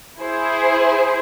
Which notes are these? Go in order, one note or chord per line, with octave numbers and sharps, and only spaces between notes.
E4 G#4 C5